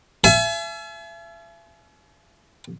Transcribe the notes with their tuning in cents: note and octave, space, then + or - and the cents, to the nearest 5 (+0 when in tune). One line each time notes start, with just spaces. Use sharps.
E5 +40 G#5 +45